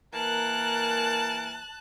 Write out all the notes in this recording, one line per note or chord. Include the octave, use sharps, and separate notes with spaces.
E3 A#3 A#4 A5 F#6